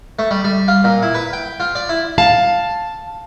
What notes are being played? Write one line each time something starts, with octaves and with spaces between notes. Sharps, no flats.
A3
G3
G3
F4
A#2
E4
B4
G5
F4
D5
E4
F5 A5